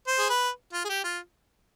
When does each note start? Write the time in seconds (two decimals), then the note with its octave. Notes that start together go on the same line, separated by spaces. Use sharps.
0.07 C5
0.19 G#4
0.30 B4
0.73 F4
0.85 G#4
0.89 G4
1.04 F4